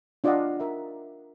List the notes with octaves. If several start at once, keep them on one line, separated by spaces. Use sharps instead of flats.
D4 F4 D5 D#5 F5 F#5
A#4 E5